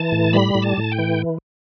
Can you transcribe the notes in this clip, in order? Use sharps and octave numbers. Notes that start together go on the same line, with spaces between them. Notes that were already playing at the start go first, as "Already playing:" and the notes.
Already playing: E3 A5
A2
G3 B5
A2
A5
A2
G5
E3